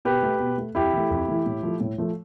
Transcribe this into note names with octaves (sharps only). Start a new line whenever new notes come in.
B2 G4 B4
A3
B2
A3
F2 E4 G4
E3 A3
F2
E3 A3
A2
F3 A3
A2
F3 A3